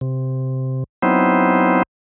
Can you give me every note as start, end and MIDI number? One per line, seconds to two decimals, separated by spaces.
0.01 0.84 48
1.02 1.83 54
1.02 1.83 59
1.02 1.83 60
1.02 1.83 63
1.02 1.83 64
1.02 1.83 72